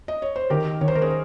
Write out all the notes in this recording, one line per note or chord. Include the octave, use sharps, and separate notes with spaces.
D#5
C#5
C5
D#3 G4 A#4
D#3 C#5
C5
A#4
G#4 C5